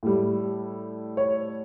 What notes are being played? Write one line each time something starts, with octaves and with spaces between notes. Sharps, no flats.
A2 G3
C#5